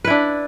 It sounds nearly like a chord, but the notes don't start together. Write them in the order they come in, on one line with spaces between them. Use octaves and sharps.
B4 E4 D4